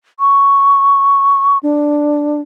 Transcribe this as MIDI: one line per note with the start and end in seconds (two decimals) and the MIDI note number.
0.20 1.58 85
1.63 2.41 62